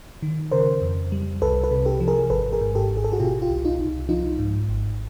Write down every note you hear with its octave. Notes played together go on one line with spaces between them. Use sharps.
D#3
C#3 A#4 C5
F2
G3
C2 A4 B4
A4 B4
C3
G4 A4
F3
G#4 A#4
G#1 A4 B4
G#4 A#4
G#2
G4 A4
G#1
G#4
A4
F#4 G#4
B2 F4 G4
F4 G4
C2
D#4 F4
C2
F3 D#4 F4
G#2
G#1